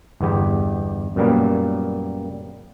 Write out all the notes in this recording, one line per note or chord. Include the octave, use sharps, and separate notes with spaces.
G1 E2 B3 G4
F#2 A#2 G3 A#3 B3